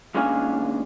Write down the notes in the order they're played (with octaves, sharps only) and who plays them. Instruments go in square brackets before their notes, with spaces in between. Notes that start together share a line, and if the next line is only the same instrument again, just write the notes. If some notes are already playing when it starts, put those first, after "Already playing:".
[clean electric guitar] D#2 G#3 C#4 D4 F5 G#5